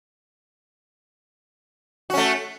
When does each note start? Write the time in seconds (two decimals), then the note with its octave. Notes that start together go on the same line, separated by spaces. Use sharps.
2.10 F#4
2.14 C#4
2.17 A3